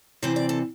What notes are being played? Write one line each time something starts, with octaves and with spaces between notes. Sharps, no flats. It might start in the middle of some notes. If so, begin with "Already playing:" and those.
C3 E3 C4 C5
D5
A4